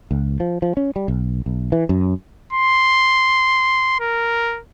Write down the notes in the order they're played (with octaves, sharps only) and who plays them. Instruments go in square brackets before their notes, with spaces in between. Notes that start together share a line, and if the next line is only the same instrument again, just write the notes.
[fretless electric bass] C#2
F3
F3
C#4
G3
B1
B1
E3
F#2
[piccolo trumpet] C6
A#4